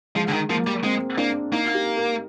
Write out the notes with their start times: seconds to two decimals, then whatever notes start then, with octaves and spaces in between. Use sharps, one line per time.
0.16 F3 G#3
0.29 D3
0.33 D#3
0.50 F3 A#3
0.67 G3
0.84 G#3 C4
1.17 A#3 D4
1.52 A#3 D#4
1.75 G4
1.97 A#4